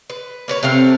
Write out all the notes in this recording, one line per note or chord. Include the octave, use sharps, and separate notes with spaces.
B4
A#3 B4 C#5
C3 A3 C4 F5